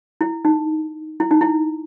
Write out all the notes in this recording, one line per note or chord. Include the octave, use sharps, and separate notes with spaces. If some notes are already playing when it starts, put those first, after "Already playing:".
E4
D#4
E4
D#4
E4